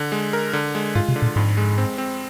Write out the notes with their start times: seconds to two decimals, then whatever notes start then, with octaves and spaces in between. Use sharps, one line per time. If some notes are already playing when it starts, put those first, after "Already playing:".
Already playing: D3
0.12 G#3
0.33 A#4
0.53 D3
0.75 G#3
0.95 G#2 F4
1.08 C3
1.16 D3
1.22 A#2
1.36 F2 G#2
1.57 G#3
1.78 C4
1.98 C4